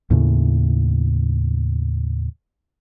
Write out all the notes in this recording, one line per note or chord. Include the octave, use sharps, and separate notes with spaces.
D#2 A2 C#3